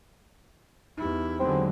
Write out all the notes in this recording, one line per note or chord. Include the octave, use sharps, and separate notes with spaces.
E2 D#4 E4 G4
D3 F#3 G#3 C4